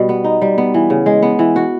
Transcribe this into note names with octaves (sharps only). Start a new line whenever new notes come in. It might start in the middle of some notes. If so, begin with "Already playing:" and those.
Already playing: B2 G3
B3
D#4
G3
B3
E3
C#3
G#3
B3
E3
F#4